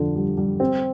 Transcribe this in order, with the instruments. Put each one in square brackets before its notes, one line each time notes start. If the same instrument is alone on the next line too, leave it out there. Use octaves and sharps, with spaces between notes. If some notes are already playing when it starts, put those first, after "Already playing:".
Already playing: [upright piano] F2 D3
G3
G3
C4